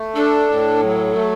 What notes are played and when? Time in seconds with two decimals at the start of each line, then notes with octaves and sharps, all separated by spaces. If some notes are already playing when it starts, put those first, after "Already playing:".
Already playing: A3
0.16 D4 A4
0.49 A2
0.82 F#3
1.15 A3